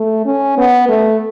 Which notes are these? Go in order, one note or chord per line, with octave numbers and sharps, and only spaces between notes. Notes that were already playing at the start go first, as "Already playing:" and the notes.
Already playing: A3
C#4
B3
A3